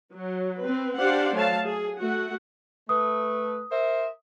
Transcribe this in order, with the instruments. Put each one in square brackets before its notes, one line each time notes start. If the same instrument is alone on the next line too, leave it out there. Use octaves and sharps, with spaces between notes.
[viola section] F#3
C4 B4
D4 G4 C5 D5 F5 F#5
F#3 A3 F5 A5
G#4
A3 F#4 F#5
[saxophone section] A3 B4 [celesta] D#6
[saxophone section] A#4 C5 E5